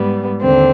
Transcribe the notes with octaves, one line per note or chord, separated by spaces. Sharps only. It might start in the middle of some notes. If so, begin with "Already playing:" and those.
Already playing: G#2 G3 B3
D#2 D3 C4